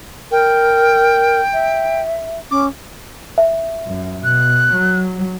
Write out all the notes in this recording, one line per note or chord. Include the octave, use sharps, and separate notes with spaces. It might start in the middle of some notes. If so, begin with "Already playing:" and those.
A#4 G5
E5
C#4 D6
E5
F#2
B2 F#6
F#3